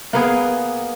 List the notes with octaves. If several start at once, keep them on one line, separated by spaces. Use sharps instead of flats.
A#3 B3 G#4